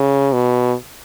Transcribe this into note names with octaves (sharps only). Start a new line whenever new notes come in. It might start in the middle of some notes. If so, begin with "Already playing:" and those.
Already playing: C#3
B2